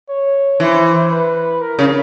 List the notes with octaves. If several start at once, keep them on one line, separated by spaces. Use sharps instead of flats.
C#5
E3 C5
B4
A#4
C#3